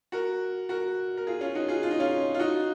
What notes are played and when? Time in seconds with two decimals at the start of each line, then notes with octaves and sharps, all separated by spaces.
0.12 F#4 A#4
0.69 F#4 A#4
1.17 A#4
1.27 F4 G#4
1.41 C#4 F4
1.55 D#4 F#4
1.68 F4 G#4
1.83 F4
1.91 D#4
2.00 C#4 F4
2.34 F4
2.39 D#4 F#4